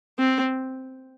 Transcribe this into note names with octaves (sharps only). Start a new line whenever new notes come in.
C4